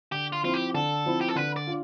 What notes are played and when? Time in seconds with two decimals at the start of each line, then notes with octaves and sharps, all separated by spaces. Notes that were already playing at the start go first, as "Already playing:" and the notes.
0.12 D3 G4
0.33 F4
0.43 F3 C4 E4 F4
0.54 G4
0.74 D3 A4
1.06 F3 C4 E4
1.21 G4
1.28 A4
1.36 D3 B4
1.56 D5
1.67 D4 F4